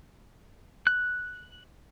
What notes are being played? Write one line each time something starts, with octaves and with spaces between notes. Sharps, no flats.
F#6